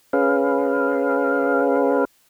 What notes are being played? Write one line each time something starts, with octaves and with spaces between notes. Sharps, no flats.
C#4 G#4 B4 F5